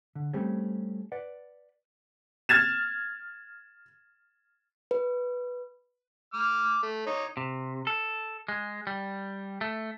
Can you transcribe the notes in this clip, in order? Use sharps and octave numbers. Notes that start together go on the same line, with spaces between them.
D3
G3 A3 C4 C#4 G4 G#4
B4 D5 F#5
F6 G#6 A6 E7
B4
D6 F6
A3
D#4 C#5
C3
A4
G#3
G3
A3